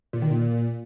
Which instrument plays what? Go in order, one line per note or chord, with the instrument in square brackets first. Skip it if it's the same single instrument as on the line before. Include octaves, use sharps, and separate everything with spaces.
[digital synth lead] A#2
D#3
A#2